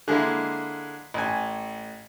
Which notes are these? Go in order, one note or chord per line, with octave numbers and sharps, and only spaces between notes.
D3 G#3 A#3 E4
A1 G#5